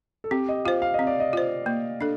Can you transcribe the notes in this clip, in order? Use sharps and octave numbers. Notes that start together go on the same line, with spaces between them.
A4
C4 G4
D#5
F4 C5 F5
F5
C4 D#5
D5
D#5
F4 C5
A#3
D4 A4